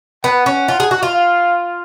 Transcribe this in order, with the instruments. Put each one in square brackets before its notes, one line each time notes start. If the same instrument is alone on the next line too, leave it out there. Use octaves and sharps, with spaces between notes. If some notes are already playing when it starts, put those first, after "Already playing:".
[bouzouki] B3 [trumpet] F#5
[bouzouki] C#4
F4
G#4
F#4
F4
[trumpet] F5